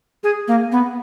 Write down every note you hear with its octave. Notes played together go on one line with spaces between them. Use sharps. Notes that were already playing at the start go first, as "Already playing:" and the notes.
G#4
A#3
B3